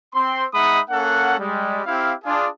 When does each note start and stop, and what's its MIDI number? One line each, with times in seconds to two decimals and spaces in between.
0.14 0.45 60
0.14 0.45 84
0.54 0.80 56
0.54 0.80 63
0.54 0.80 76
0.54 0.80 78
0.54 0.80 83
0.54 0.80 87
0.90 1.36 58
0.90 1.36 61
0.90 1.36 69
0.90 1.36 78
1.39 1.80 55
1.39 1.80 56
1.85 2.13 60
1.85 2.13 64
1.85 2.13 67
1.85 2.13 77
2.25 2.47 62
2.25 2.47 65
2.25 2.47 68